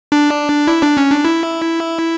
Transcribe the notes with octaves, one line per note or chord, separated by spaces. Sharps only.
D4
E4
D4
C#4
D4
E4